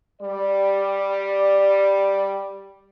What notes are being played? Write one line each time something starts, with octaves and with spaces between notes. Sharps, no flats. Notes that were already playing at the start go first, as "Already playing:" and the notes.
G3 D5